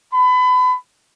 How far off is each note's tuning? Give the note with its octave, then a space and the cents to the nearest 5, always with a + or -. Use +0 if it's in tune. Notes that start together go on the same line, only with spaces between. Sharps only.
B5 +30